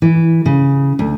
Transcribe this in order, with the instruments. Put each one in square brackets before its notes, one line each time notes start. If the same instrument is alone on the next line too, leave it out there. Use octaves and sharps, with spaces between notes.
[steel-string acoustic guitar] E3
C#3
D2